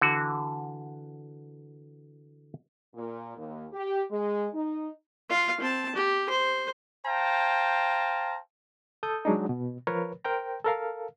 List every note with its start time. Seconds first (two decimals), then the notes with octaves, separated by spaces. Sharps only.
0.01 D3 E3 F#4
2.95 A#2
3.37 D#2
3.72 G4
4.10 G#3
4.53 D#4
5.29 F4 F5
5.61 C4 A5
5.95 G4
6.29 C5
7.06 C5 F5 G5 A5 A#5
9.03 A4 D#6 G6
9.25 F#3 G#3 D4 D#4
9.49 B2
9.87 F3 A#4 B4 C#5
10.24 A#4 C5 G5 A#5
10.64 A4 A#4 F5